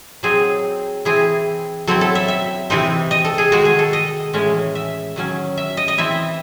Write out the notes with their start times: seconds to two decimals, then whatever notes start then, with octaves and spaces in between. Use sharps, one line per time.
0.23 F#3 C4 D#4 G#4
1.05 E3 C4 E4 G#4
1.87 F#3 C4 E4 A4
2.01 A4
2.15 E5
2.28 E5
2.70 C3 E3 C4 D#4
3.11 D#5
3.24 A4
3.38 G#4
3.52 D#3 G#3 D#4 F#4
3.65 G#4
3.79 A4
3.93 D#5
4.33 A2 E3 G#3 C#4
4.75 E5
5.16 D#3 F#3 C#4
5.58 E5
5.77 D#5
5.88 D#5
5.98 E3 C4 E4 E5